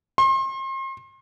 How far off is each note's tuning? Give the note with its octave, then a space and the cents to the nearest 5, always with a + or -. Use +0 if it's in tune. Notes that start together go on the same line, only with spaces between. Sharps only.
C6 +40